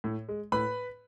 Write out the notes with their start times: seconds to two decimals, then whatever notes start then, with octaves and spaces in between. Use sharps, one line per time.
0.04 A2
0.29 G#3
0.52 A2 B4 B5